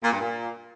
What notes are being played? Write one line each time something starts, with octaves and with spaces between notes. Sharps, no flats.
A#2
G2
A#2